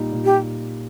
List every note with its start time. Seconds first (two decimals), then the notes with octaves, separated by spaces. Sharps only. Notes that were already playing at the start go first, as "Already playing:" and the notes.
Already playing: A#2 G3 D#4
0.12 A#2
0.25 G4